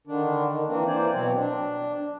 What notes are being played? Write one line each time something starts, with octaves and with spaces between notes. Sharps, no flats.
D3 D#3 D4
D#3
E3 A#3 C4 D4
E3 A#3 C5 D5 G#5
B2 F#3 C4
D4